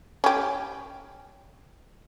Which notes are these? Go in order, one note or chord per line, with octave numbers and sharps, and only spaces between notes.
C#4 G4